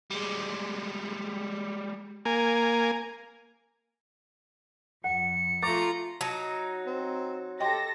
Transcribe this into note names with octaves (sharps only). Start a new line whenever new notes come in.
G3 G#3
A#3 G#5
F2 F#5 C#7
A3 F4 A#5 C#6 D6 A6
F#3 D#4 A5
C4
G4 A4 D#5 G5 C6 A#6